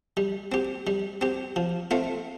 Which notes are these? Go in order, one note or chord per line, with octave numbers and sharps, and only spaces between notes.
G3
C4 G4
G3
C4 G4
F3
A3 C4 F4